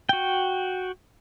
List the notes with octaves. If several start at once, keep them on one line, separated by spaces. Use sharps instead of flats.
F#4 G5